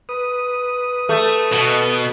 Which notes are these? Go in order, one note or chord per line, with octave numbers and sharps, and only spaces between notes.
B4 D#6
A3
B2